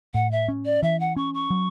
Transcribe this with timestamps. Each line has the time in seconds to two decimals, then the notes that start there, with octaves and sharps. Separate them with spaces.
0.14 A2 F#5
0.32 E5
0.48 C#4
0.66 D5
0.83 E3 E5
1.00 F#5
1.17 C#4 C#6
1.34 C#6
1.50 F#3